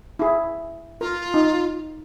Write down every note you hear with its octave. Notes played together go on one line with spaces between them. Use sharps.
E4 G#4
F4 A#4
D#4